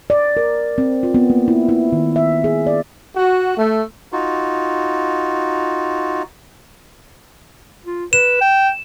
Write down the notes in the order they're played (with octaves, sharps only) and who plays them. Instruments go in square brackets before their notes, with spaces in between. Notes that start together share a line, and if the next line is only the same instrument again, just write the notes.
[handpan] D5
A#4
C4
F4
B3
A#3
E4
E4
D#3
E5
G#4
D5
[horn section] F#4
A3
[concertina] D#4 F4 F#4
[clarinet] F4
[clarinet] B4 [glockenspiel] E7
[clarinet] G5